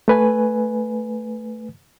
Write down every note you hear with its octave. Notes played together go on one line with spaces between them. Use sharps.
A3 B4 G#5